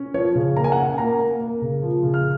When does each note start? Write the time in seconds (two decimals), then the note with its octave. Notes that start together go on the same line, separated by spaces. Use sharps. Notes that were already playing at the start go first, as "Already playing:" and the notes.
Already playing: C#4
0.14 F3 C#5
0.35 C#3
0.56 A#3 A#5
0.64 G#5
0.72 F#5
0.78 C#4 G#5
0.93 G#5
0.98 A#3 A#5
1.19 A#3
1.41 A#3
1.62 C#3
1.83 F3
2.03 C#3
2.14 F6